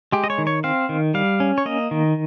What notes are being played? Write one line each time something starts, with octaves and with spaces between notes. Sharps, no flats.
G#3 G4
D#5
C#5
D#3
C#5
C4 F5
D#3
G3 F5
C#4
C#5
A#3 D#5
D#3